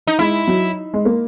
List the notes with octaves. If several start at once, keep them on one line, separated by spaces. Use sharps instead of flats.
D#4
G#3 E4
F#3
G#3
A#3